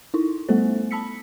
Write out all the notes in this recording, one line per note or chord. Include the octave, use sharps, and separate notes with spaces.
D#4 E4
G3 A3 B3 A4 C5
A5 B5 E6 B6 C#7